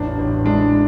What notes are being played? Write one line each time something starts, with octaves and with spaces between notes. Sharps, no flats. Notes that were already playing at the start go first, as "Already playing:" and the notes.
Already playing: A1 E2 D4
A1
G#3 D4